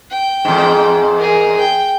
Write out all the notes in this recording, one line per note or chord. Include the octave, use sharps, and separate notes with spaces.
G5
E2 G#2
G#4 A#4
G5